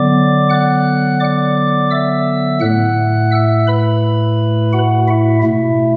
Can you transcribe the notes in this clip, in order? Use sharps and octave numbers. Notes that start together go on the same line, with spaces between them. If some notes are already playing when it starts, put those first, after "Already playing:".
Already playing: D3 F#3 B3 D5 D6
F#5 F#6
D5 D6
E5 E6
A2 A3 F#5 F#6
E5 E6
B4 B5
F#4 F#5
E4 E5
B2 A3 E4 E5